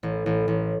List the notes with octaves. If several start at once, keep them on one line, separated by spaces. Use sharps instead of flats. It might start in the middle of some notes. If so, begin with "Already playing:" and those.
A1
A1
A1